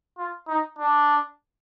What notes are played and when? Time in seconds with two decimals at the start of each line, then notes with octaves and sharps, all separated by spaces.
0.18 F4
0.48 D#4
0.79 D4